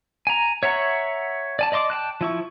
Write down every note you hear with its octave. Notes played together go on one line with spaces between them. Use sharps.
G#5 A#5
C#5 E5 F#5 A#5 C#6
D5 G#5 A5
D5 D#5 C6 D6
G5 A5 F#6
F3 E4 C#6